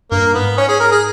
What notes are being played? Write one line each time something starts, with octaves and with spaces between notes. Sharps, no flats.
G2 A#3
G#2 B3
C#4
G#4
A#4
G#4